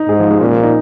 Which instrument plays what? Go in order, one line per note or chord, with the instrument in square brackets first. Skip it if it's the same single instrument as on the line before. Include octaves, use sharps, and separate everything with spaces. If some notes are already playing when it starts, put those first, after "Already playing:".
Already playing: [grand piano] D#4
[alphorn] G#2 [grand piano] G#4
[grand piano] F3
G#3
[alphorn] A#2 [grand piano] C#4
[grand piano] F3
D#4